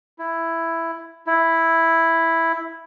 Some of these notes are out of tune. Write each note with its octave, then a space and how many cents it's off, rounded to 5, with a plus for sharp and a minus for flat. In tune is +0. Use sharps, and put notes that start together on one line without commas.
E4 +5
E4 +0